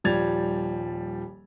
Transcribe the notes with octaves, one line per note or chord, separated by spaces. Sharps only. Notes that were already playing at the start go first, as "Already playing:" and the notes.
D#1 F3 G3 G#6 A6 F7